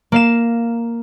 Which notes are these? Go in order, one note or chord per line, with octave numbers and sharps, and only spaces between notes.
A#3 F5 E7